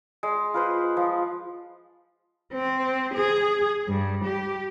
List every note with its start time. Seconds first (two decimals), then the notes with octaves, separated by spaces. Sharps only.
0.23 G#3
0.54 F4 B4 C5
0.97 F3
2.53 C4
3.14 G#4
3.88 G2
4.24 G4